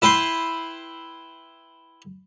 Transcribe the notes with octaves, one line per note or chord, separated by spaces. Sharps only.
E4 B4 G5 C6